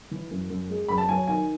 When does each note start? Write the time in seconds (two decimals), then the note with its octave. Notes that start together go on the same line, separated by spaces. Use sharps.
0.11 E3
0.31 F#2
0.50 F#2
0.70 G#3
0.88 F#2 B5
0.98 A5
1.09 F#3 G#5
1.27 D#3 G#5